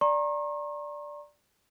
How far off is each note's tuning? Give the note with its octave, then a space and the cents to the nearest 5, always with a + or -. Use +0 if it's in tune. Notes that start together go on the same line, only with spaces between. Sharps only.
D5 +0 A#5 +0 C#6 -45